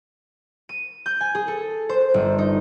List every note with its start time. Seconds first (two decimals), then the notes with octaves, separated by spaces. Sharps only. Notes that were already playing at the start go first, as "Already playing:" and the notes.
0.69 D#7
1.06 G6
1.21 G#5
1.35 G#4
1.48 A4
1.89 C5
2.14 G1
2.38 D#4